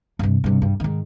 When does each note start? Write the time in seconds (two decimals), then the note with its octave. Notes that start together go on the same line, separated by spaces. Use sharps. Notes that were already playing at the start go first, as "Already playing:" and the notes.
0.19 G2 C3
0.44 G2 C3
0.62 G2
0.80 G#2 D#3